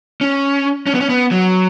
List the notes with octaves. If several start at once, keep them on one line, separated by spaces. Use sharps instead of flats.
C#4
C#4
B3
C#4
B3
F#3